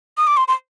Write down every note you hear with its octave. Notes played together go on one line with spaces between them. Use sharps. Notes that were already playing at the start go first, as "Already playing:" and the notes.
D#6
D6
C6
C6